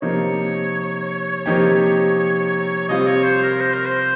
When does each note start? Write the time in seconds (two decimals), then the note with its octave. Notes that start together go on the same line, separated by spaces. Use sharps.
0.02 C3 F3 A#3 D#4 C#5
1.46 C3 F3 A#3 D#4 G4
2.89 C3 G3 C4 F4 D#5
3.07 C#5
3.24 C5
3.42 A#4
3.61 C5
3.73 A#4
3.86 C5